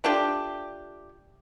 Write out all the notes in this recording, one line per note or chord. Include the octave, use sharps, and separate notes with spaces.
A3 D4 F4 G4